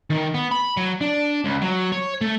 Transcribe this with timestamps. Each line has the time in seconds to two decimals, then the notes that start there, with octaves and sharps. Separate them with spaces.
0.10 D#3
0.34 B3
0.51 B5
0.77 F#3
1.01 D4
1.44 C#2
1.62 F#3
1.92 C#5
2.21 A3